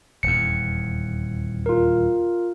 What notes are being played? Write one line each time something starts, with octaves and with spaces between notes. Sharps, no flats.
D#1 E2 C#7
F4 A#4